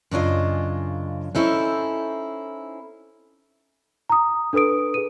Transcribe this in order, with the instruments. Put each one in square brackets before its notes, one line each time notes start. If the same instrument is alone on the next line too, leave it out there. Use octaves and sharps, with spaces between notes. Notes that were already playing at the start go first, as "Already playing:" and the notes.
[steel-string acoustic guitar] F#2 C#3 D4 F4 D#5
C#4 D#4 E4 A4 C5
[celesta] A#5 D#6
D4 A4 B4 D#6 D7
G#4 B4 D#7